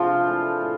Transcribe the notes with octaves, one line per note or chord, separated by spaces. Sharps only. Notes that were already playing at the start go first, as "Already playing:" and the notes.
Already playing: C3 F3 G#3 C4 D4 F4 C5
E3 A3
A2